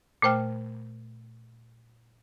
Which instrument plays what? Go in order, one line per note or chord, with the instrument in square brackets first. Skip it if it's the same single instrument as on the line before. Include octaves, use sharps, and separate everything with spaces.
[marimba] A#2 A3 C5 G5 F6